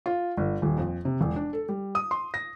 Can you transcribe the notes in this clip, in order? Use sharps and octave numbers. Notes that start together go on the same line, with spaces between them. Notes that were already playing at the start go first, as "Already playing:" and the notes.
F4
G1
D#1
F2
C3
E1
D4
A4
G3
D#6
C6
A#6